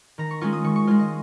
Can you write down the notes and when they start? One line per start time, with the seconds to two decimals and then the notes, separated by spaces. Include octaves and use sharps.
0.18 D#3 A#5
0.31 C#6
0.41 G#3 C#4 F4 C#6
0.53 D#6
0.64 D#3 C#6
0.76 C#6
0.87 G#3 F4 C#5
0.99 D#5